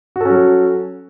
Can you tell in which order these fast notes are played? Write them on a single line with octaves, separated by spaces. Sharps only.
F#4 A4 C#4 F#3